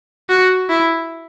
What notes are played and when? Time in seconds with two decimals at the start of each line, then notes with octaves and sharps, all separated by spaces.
0.29 F#4
0.69 E4